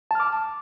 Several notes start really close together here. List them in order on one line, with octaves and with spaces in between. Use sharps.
A5 F6 D6